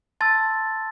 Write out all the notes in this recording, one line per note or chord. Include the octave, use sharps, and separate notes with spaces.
A5 C6 E6 A6